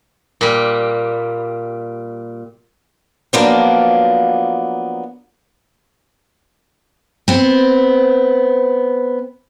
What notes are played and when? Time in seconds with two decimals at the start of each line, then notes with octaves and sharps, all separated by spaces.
0.41 A#2 G3
3.33 F3 F#3 A#3 B3 D4
7.28 B3 C4